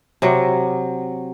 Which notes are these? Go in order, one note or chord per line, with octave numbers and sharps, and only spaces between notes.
C3 F#3